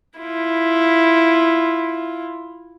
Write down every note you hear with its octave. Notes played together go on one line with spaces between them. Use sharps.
E4 F4